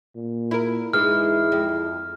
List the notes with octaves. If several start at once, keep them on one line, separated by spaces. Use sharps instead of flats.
A#2
E4 A#4
G#2 E3 G#3 E4 F6
F2